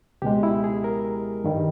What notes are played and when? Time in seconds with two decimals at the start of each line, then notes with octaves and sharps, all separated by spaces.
0.22 C#2 B2 G#3 G4
0.43 E4
0.64 G#4
0.84 A#4
1.44 G2 D#3 G3